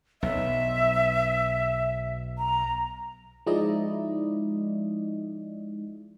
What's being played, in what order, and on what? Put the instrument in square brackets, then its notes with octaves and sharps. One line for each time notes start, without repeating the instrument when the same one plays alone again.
[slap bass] B1 [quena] E5
[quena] A#5
[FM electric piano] F3 G#3 D#4 E4 D5 D#5